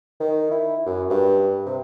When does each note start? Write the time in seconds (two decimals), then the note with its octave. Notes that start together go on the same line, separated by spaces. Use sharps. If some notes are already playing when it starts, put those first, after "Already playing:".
0.20 D#3
0.51 E4
0.86 F#2
1.10 G2
1.66 C3